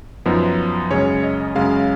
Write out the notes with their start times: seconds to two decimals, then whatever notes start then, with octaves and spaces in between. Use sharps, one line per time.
0.25 F#2 F3 B3 D#4
0.90 F#2 C#3 G#3 C#4 C#5
1.23 D#5
1.55 F#2 C#3 G#3 C#4 F5